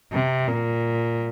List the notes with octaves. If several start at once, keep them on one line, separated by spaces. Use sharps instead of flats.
C3
A#2